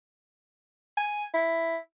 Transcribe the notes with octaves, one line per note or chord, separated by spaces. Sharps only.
G#5
E4